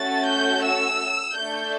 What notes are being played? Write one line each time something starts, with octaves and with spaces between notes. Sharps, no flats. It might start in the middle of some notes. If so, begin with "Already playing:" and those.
Already playing: A3 C#4 F#4 A4 A6
G6
E6
A3 D4 A4 G6